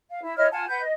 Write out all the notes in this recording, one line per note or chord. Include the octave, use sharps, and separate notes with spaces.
F5
E4
E4 C#5 D#5 F6
F4 F#5 G#5 A5
B4 F#5 G6
D#5